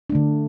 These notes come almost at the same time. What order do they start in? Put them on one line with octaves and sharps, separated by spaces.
D4 A3 D3